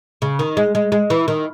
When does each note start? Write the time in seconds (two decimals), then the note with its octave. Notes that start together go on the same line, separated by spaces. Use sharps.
0.22 C#3
0.39 D#3
0.57 G#3
0.75 G#3
0.92 G#3
1.10 E3
1.28 D#3